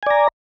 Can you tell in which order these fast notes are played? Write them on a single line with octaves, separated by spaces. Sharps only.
G#5 D5 A#5